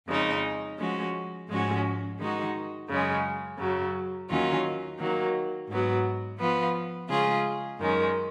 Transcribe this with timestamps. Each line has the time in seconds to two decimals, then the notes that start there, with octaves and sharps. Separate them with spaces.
0.08 F2 C#3 G#3 D#4
0.79 F3 G#3 C#4 F#4
1.48 G#2 F3 G#3 C#4 F#4
2.19 D#3 G#3 D#4 F#4
2.88 F#2 C#3 G#3 C#4
3.59 F#2 C#3 F#3
4.29 D#2 D#3 F#3 C#4 F4
4.98 D#3 F#3 A#3
5.68 G#2 F#3 B3
6.38 F3 B3 F4
7.08 C#3 G#3 C#4 F4 G#4
7.78 F#2 D#3 G#3 C#4